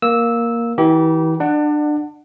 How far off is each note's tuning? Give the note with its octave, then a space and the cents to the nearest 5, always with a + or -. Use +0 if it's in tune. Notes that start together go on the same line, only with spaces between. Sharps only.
A#3 +5 E6 -10
E3 -35 G4 -25 A#5 +45
D4 +25 D5 +35 F#5 +0